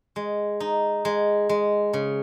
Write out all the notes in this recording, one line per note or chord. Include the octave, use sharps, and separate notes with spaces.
G#3
D#4
G#3
G#3
C#3